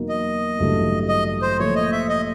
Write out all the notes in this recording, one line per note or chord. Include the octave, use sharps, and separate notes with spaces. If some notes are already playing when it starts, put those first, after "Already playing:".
Already playing: E2 B2 F#3 A#3 D#4
D#5
A1 G2 D3 F#3 A3
D#5
C5
A#2 F3 A3 C#5
D#5
E5
D#5